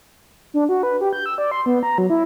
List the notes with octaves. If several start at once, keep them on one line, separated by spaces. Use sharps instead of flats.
D4
F#4
B4
G4
G6
E6
D5
C6
B3
A#5
F#3
E4